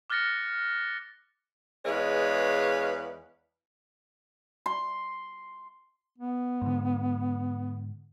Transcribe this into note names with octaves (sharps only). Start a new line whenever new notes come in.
D6 F6 F#6 A6 A#6 C#7
E2 G#3 B4 C#5 F5
C6
B3
G#2 D3